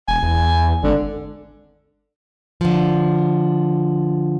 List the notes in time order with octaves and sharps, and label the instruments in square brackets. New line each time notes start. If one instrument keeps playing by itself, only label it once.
[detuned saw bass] E1 [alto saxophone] G#5
[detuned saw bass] E2
[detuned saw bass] G#1 [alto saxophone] D3
[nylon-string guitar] D3 F3